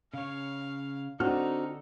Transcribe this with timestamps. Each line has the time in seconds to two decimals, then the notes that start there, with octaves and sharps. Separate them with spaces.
0.14 C#3 C#5 F5
1.20 D3 C4 D4 D#4 F#4 A4 F6